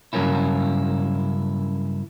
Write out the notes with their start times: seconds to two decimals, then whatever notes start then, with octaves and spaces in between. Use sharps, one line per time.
0.13 G2 C#3 F#3 A#3 C#4 E4